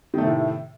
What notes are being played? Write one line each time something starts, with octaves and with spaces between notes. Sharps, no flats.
A2 C3 D#3 A3